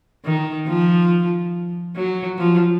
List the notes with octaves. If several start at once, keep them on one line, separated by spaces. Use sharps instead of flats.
D#3
F3
F#3
F3